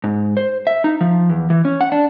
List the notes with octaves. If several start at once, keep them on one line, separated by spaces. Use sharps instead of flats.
G#2
C5
E5
D#4
F3
E2
E3
C#4
F#5
D4